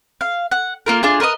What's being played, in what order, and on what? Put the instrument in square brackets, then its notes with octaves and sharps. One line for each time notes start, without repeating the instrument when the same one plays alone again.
[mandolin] F5
F#5
A#3 F4 A#4
D4 F4 G#4
A#4 B4 C#5 D#5